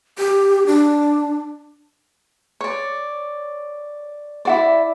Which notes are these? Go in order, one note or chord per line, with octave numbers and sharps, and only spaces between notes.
G4
D4
C#5 D5
E4 F#4 D5